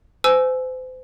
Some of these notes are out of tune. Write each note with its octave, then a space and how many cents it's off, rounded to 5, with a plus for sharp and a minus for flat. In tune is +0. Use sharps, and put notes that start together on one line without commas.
C5 -35 G#5 +25 E6 +0